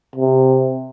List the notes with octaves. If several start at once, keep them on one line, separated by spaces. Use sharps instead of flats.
C3